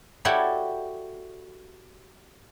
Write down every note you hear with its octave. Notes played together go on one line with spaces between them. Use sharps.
E4 F#4 G4 A4 C#5 D5